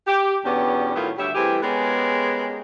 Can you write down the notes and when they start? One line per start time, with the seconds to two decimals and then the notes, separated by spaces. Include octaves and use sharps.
0.07 G4
0.45 E2 B2 B3 C#4 D4 G4
0.95 A2 D#3 F#3 B3 E4 F4
1.18 D2 G3 G4 C#5 E5
1.35 E3 G3 A3 C4 G4 G#4
1.63 G#3 B3 C#4 G4 G#4 A#4